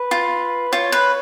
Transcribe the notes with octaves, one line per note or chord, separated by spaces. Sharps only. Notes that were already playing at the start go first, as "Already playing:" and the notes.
Already playing: B4
F4
F4 C#5
B4